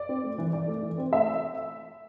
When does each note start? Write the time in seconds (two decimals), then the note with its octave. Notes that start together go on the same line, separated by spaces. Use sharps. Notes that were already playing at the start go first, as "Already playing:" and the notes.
Already playing: D5
0.09 C4
0.24 A3
0.38 E3
0.53 E3 D5
0.68 A3
0.82 E3
0.98 C4
1.12 A3 E5